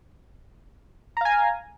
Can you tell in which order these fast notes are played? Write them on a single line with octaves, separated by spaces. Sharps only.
A#5 F5 G#5